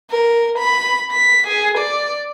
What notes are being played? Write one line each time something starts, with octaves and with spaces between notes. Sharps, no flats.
A#4
B5
B6
G#4
D5